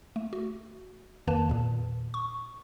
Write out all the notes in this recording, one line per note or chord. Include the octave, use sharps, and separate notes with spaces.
A3
F#4
F2 D#3 A#3 B4 A5
E2 A#2
C#6